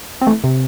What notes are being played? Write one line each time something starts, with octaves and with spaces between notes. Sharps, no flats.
C4
E3 A3
C3